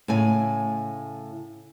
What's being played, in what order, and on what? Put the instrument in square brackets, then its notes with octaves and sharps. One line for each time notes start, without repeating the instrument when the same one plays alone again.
[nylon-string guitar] A2 C#3 G#5